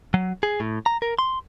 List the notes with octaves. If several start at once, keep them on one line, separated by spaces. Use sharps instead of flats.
F#3
G#4
A2
A#5
A#4
C6